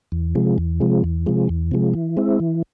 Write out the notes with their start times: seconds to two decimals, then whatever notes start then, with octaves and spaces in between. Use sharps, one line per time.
0.12 E2
0.35 C3 F3 G#3
0.58 E2
0.80 C3 F3 G#3
1.04 E2
1.26 C3 F3 G#3
1.49 E2
1.71 C3 F3 G#3
1.94 E3
2.17 G#3 C4 E4
2.40 E3